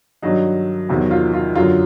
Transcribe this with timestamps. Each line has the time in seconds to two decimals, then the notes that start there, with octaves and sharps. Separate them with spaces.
0.22 G2 D#3 F#3 D#4
0.89 E2 C3 D#3 F#3
1.11 F4
1.34 F4
1.55 F#2 D3 F#3 F4